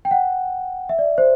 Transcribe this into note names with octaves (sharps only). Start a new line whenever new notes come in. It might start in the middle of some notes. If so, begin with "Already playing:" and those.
G5
F#5
E5
D5
C5